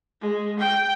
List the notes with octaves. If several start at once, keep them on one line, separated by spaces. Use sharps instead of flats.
G#3
G5